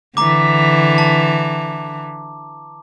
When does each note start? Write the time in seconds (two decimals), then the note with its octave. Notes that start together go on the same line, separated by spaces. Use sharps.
0.17 D3 E3 A#5 D6
0.98 A5